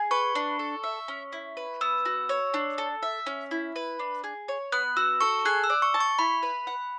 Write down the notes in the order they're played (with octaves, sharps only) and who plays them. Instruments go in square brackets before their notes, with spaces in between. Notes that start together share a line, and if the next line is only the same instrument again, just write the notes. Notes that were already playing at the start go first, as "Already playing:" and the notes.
Already playing: [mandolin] G#4
[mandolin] B4 [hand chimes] C#6
[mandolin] D4
A4
E5
C#4
E4
B4
[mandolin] B3 [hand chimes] E6
[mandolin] F#4
C#5
D4
A4
E5
C#4
E4
B4
D4
G#4
C#5
[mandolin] B3 [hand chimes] F#6
[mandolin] F#4 [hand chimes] E6
[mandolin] A4 [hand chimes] C#6
[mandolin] G#4 [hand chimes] F#6
[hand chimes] E6
[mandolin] D5
[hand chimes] C#6
[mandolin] A5
[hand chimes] C#6
[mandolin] E4 [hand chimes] B5
[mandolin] B4
F#5